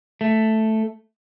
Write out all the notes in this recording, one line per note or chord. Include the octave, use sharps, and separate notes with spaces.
A3